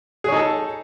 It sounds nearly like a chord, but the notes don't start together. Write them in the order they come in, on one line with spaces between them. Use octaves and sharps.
G#4 C#5 D#4 A4